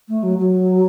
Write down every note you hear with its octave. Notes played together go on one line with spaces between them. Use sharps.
A3
F#3
F#3